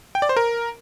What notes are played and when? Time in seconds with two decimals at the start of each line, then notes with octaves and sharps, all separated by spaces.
0.15 G5
0.22 D5
0.29 C5
0.37 A#4